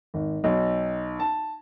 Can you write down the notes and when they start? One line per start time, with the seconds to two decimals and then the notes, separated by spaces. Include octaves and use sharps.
0.14 G#1
0.44 B1
1.20 A5